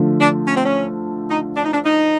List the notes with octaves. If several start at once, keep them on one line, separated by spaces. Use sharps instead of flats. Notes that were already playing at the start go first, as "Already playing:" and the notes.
Already playing: D3 F3 A3
D4
C#4
C4
C#4
D#4
D4
D#4
D4
D#4